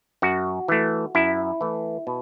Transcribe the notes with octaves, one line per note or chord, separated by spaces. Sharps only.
F#2 F#4
E3 A3
F#2 E4
E3 A3
B2